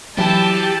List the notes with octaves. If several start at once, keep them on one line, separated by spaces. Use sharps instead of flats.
E3 F#3 G4 A5